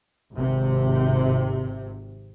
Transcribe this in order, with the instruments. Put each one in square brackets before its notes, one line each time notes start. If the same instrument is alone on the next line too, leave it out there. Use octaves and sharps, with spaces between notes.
[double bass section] G#1 C3